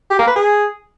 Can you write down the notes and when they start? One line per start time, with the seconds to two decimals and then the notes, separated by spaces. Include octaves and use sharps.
0.10 G4
0.19 A#3
0.27 B4
0.36 G#4